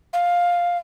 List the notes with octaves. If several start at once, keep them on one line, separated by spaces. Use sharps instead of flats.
F5